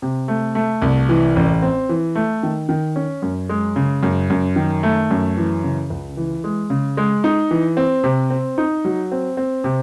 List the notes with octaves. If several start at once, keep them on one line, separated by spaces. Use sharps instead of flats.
C3
A3
A3
C2
E3
A1
C4
E3
A3
D#3
D#3
C#4
F#2
G#3
C#3
F#2
F#2
D#3
A3
F#2
E3
C#3
C#2
E3
G#3
C#3
G#3
D#4
E3
C4
C3
C4
D#4
F#3
C4
C4
C3